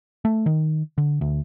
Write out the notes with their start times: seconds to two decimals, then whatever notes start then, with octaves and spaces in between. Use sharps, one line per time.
0.25 A3
0.46 D#3
0.98 D3
1.21 D2